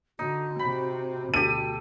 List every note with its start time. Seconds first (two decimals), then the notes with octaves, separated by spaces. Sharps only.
0.19 D3 D#4 F#4
0.59 C3 C4 B5
1.34 D2 B2 G4 A4 D#7